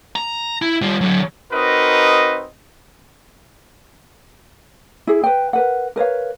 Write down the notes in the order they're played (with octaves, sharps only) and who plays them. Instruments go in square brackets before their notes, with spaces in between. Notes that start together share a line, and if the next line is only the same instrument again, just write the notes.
[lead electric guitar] A#5
E4
G3 F4
D3 F#3
[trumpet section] C4 D#4 F#4 A#4 B4 D#5
[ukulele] E4 G#4
B4 G5
A#4 B4 F#5
A#4 B4 C#5 F5